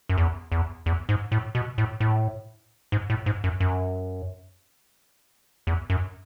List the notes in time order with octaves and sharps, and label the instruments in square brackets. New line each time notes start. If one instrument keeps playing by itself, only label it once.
[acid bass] F#2
E2
E2
E2
G#2
A2
B2
A2
A2
G#2
A2
G#2
F#2
F#2
E2
F#2